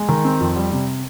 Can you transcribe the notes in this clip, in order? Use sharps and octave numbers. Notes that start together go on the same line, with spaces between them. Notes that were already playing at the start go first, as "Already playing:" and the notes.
Already playing: G#3
D#3
C4
F2
G3
C3